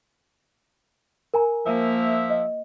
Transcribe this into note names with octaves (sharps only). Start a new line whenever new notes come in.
A#4 G#5 A#5
F3 A#3 E5
D#5